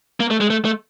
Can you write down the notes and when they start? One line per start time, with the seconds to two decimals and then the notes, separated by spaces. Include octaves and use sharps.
0.20 A#3
0.30 A3
0.41 G#3
0.50 A3
0.65 A3